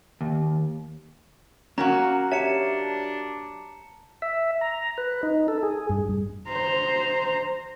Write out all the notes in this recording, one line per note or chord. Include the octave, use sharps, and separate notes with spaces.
D#2
F#3 A#3 C#4 F#4 A#5
D4 G4 C#5 E5 A5 C#7 E7
E5
A#5
B4
D#4
A4
G#4
G2
C5 A#5